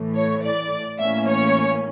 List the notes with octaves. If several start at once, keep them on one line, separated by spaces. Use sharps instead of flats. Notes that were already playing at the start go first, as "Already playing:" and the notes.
Already playing: A2 E3 A3
C#5
D5
A2 E3 A#3 C#4 E5
C#5